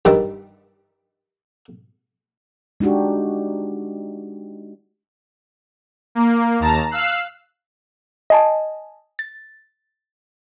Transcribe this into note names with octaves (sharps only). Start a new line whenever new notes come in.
G2 D#3 G3 E5 D6
G#3 D4 D#4 F#4 G4
A#3
D#2 A5 A#5
F5 E6 F#6 C7
D#5 G#5 A5
A6